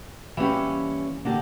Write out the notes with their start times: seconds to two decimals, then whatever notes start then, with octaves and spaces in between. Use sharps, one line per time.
0.37 E3 G3 A#3 C#4 G4
1.25 D3 A#3 D4 G4